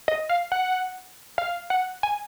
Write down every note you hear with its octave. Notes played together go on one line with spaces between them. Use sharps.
D#5
F5
F#5
F5
F#5
G#5